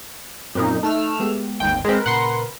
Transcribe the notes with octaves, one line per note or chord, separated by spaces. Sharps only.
F#2 A#2 C4 D#4
A3 D#4 E6 F6
G#3 B3 G4
G#1 D#2 G5
G#3 C4 A#4 B4
A#2 C#3 F#5 C6